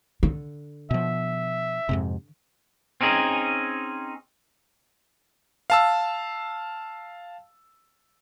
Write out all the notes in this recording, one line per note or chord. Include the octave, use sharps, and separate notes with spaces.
D3
B2 F3 E5
F2 G#2 C3
C4 C#4 D#4 G#4
F5 A5 E6